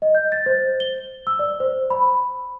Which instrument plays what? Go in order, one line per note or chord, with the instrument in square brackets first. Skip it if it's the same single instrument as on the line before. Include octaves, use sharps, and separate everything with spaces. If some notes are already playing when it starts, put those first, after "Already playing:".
[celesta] D#5
G6
A6
C5
G7
E6
D5
C5
B5